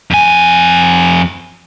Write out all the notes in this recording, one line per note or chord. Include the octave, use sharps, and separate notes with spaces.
F2 G#5